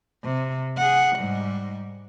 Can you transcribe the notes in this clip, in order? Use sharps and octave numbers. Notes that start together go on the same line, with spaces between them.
C3
G#4 F#5
G#2 G3